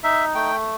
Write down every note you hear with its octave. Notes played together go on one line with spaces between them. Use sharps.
D#4 E5
A3 G5